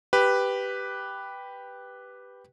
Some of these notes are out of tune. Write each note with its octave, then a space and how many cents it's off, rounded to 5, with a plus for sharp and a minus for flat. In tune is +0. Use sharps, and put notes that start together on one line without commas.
G4 +0 B4 +0